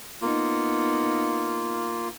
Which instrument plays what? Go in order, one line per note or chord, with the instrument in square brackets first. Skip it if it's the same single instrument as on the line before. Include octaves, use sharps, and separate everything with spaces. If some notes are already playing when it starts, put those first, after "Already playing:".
[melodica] A#3 F4 [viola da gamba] B3 D#4